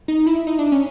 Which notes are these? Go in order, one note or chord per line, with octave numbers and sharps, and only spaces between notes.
D#4
E4
D#4
D4
C#4